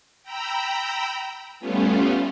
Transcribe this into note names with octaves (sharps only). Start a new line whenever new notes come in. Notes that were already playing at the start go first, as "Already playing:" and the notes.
G5 A#5 B5 E6
G3 A3 B3 C#4 F4